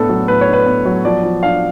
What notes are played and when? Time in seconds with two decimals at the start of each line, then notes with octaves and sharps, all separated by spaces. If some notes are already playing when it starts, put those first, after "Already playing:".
Already playing: A2 B3 D4 A4
0.09 F#3
0.28 A2 B4
0.41 C#5
0.48 D4
0.53 B4
0.66 B3
0.85 F#3
1.05 F3 D5
1.23 F3
1.43 D4 F5